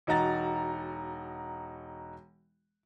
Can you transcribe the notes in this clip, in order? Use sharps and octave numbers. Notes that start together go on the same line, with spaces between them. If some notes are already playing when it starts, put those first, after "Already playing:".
E1 D#4 F#4 A#5 A6